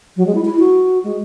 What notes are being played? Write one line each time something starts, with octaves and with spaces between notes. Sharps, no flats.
F#3
G#3
E4
E4
F#4
G#3